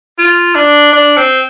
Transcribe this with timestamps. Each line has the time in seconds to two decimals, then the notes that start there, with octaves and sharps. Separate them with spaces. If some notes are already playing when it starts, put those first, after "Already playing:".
0.18 F4
0.55 D4
0.93 D4
1.17 C4